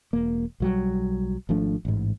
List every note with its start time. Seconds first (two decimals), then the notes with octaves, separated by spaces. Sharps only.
0.13 E1 A#3
0.60 B1 F#3 G3
1.49 G#1 F3 A3 D4
1.85 A1 G#2